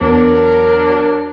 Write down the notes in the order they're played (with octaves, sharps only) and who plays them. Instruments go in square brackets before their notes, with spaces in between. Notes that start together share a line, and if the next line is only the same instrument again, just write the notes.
[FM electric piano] E2 B3 [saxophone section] F#3 D4 [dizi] A#4